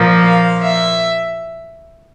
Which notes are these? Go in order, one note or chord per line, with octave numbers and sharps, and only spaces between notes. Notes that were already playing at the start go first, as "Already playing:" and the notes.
Already playing: A#2 F3 A#3
F5
E5